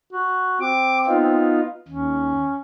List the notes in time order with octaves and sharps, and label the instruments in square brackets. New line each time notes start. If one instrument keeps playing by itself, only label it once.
[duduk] F#4
[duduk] C4 [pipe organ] D6
[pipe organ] B3 D#4 F4
[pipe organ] D#2 [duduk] C#4